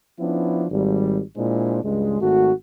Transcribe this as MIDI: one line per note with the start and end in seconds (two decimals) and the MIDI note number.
0.19 0.65 53
0.19 0.65 59
0.19 0.65 61
0.19 0.65 62
0.19 0.65 64
0.71 1.20 32
0.71 1.20 55
1.37 1.79 46
1.37 1.79 56
1.37 1.79 62
1.37 1.79 64
1.37 1.79 72
1.83 2.18 37
1.83 2.18 43
1.83 2.18 56
2.21 2.52 32
2.21 2.52 57
2.21 2.52 66